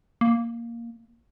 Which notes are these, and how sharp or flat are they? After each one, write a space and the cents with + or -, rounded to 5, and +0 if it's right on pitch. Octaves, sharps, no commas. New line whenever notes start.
A#3 +0